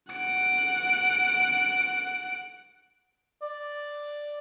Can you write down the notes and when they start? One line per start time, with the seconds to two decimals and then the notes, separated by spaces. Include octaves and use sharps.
0.11 F#5 D7
3.42 D5